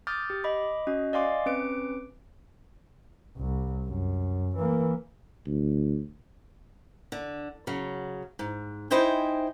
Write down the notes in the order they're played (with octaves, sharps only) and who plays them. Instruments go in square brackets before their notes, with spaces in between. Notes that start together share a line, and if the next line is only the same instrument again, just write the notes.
[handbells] D6 D#6 F6 G6 A6
G4
D#5 B5 D6
C#4 F#4 D#5
D5 D#5 F5 G#5 C6 D6
C4 C#4 B4 D6 D7
[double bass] C2
F#2
E3 A#3
[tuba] D2
[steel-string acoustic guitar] D3
C#3 F#3
G#2
D#4 E4 C5 D#5 G5 G#5